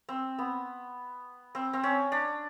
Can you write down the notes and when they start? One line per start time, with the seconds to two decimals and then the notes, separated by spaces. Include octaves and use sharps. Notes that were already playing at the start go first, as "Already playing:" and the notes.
0.09 C4
0.38 B3
1.55 C4
1.73 C4
1.84 C#4
2.12 D4